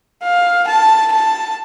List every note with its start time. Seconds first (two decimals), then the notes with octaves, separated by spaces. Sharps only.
0.23 F5
0.68 A5
1.13 A5